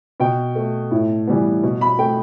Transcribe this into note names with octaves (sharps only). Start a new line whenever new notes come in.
B2 G5
A3
A2
E3 G3 B3
B2
B5
A3 G5